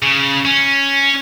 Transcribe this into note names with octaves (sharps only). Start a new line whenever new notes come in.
C#3
C#4